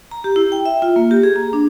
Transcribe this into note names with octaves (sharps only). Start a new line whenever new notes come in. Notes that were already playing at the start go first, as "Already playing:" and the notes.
A#5
G4
E4
G5
E5
F4
A#3
G4
G#4
A#5
D4